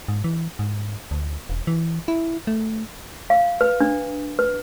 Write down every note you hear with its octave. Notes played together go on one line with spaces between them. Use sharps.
G#2
E3
G#2
D2
E1
E3
E4
A3
F5
B4
D4
B4